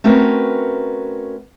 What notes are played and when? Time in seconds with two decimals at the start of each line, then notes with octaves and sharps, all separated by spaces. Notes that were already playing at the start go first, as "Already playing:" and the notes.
0.04 A3 C4 C#4 F#4 A#4 B4